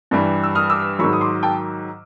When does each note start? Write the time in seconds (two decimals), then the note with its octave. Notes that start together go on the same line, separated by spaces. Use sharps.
0.11 G2 E3 G3
0.43 E6
0.55 D#6 F6
0.70 D6 E6
0.99 G#2 D#3 F#3 B5 C#6
1.13 D#6
1.21 C6 D6
1.43 G5 A5